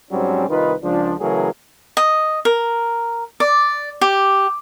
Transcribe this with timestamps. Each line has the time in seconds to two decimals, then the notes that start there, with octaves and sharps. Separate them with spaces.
0.11 G#2 F#3 G3 C4 C#4
0.49 C2 D#3 D#4 F4 B4
0.83 C#2 F3 D4
1.20 C#3 E3 F#3 A3 G#4 A#4
1.97 D#5
2.45 A#4
3.40 D5
4.01 G4